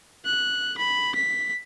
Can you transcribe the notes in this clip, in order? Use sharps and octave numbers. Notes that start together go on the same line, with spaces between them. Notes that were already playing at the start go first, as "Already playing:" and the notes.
F#6
B5
B6